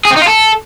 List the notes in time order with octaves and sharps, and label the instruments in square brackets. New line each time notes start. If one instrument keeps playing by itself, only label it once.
[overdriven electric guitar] G#4
C4
D#4
F4
A4